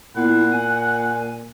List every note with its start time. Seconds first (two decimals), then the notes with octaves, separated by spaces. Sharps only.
0.16 A#2 B3 E4 F#5
0.52 G#5